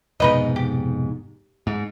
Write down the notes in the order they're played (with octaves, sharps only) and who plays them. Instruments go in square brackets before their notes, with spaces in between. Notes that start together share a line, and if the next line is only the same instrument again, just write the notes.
[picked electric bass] F1 G#2 B2 [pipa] D#4 B4 D#5
[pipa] G4
[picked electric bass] G#2